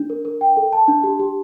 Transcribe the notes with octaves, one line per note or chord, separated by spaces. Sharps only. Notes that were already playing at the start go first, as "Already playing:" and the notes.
Already playing: D4
A#4
A#4
G5
A4
A5
D4
G4
G4